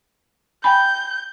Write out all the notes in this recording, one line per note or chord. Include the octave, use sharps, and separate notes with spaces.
G5 G#5 B5 G6